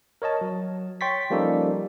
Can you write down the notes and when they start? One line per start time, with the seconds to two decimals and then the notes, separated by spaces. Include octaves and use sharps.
0.22 A#4 C#5 D#5 A5
0.41 F#3
1.01 C#5 G5 C6 C#6 A6 B6
1.30 F3 G3 A#3 C#4 D#4 A4